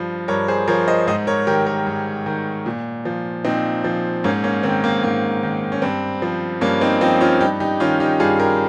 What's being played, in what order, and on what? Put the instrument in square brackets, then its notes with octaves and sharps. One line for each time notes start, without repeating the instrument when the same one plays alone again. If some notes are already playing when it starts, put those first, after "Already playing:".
Already playing: [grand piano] G2 F3
G2 A#4 C#5
G#4 C5
F3 A#4 C#5
C5 D#5
G#2 C5 D#5
A#4 C#5
D#3 G4 A#4
G4 A#4
G#2
D#3
A#2
F3
A#2 C4 D#4
F3
G#2 A#3 C#4
A#3 C#4
D#3 C4
A#3
G#2 A#3
D#3
C#4
G2 C4
F3
G2 A#3 C#4
C4 D#4
F3 C4 D#4
C#4 F4
G2 D#4 G4
D#4 G4
D#3 C#4 F4
D#4 G4
G2 F4 G#4
G4 A#4